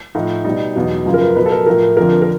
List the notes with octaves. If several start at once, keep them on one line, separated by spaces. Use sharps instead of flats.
A2 F3 D#4
B2 G3 D#4
E2 B2 F#3
F#2 C#3 F3 F4
A#4
B4
B2 F#3 B4
A4
A#4
A2 F3 A#4
F2 D3 F3 A#4
A#4